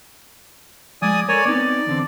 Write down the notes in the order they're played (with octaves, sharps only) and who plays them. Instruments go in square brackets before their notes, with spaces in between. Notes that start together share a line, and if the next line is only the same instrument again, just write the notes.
[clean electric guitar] F3 G#3 [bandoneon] D5 G#5 D#6
[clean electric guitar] A4 A#4 [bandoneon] C#5 D5 G#5
[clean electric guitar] B3 C4 D#4 [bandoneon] D5
[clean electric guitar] E2 D3 C4